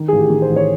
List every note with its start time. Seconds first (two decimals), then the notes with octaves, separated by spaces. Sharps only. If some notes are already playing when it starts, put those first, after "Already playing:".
Already playing: D#3
0.08 A1 G#4
0.18 G4
0.30 D#3
0.42 C5
0.49 A1
0.56 C#5